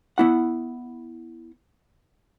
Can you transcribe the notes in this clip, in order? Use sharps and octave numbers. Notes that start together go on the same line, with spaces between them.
B3 E4 F#5